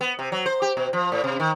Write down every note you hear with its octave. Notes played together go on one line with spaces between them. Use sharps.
B3
C3
F#3
C5
G4
B2
F3
A2
C3
D#3